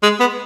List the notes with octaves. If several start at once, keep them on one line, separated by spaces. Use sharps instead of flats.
G#3
B3